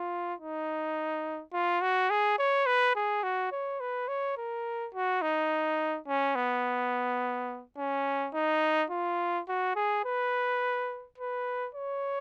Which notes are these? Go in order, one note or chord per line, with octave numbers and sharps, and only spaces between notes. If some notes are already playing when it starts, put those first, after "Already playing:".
Already playing: F4
D#4
F4
F#4
G#4
C#5
B4
G#4
F#4
C#5
B4
C#5
A#4
F#4
D#4
C#4
B3
C#4
D#4
F4
F#4
G#4
B4
B4
C#5